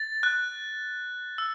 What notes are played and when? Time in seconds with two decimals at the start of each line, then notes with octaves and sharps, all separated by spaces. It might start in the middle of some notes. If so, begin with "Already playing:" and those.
Already playing: A6
0.23 F#6
1.38 E6